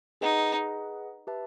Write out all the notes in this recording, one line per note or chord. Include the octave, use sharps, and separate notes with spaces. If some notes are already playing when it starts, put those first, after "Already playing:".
D#4 G#4 B4 D#5 F#5
G4 B4 E5 A5